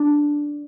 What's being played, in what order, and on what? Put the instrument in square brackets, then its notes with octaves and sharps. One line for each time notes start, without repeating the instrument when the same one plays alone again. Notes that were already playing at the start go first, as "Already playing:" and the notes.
Already playing: [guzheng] D4